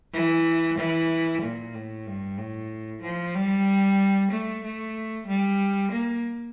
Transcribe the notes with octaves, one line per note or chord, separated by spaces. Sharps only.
E3
E3
A#2
A2
G2
A2
F3
G3
A3
A3
G3
A#3